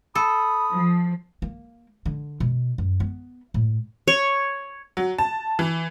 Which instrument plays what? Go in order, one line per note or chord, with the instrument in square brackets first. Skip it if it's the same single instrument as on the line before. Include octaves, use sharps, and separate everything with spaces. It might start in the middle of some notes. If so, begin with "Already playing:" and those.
[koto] A4 [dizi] B5 [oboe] D#6
[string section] F3
[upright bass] A#3
D3
B2
F#2
B3
A2
[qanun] C#5
[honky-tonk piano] F#3
A5
E3